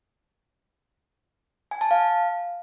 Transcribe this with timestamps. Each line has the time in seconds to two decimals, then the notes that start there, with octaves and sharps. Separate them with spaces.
1.71 G#5
1.81 A5
1.91 F5